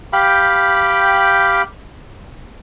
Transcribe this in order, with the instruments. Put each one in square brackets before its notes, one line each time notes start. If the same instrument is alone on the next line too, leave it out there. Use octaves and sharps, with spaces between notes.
[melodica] G4 F5 G5 B5